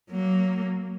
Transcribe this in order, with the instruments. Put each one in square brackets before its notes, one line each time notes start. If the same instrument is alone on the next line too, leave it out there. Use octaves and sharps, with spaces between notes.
[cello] F#3 A#3